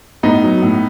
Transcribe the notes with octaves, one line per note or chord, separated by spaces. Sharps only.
A2 B3 D#4
F#3
A2